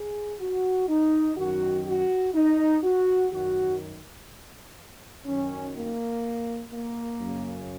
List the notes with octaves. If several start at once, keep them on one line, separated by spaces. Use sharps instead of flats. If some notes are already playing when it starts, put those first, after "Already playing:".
Already playing: G#4
F#4
D#4
F#2 D#3 F#4
F#4
D#4
F#4
F#2 D#3 F#4
F#2 D#3 C#4
A#3
A#3
F#2 C#3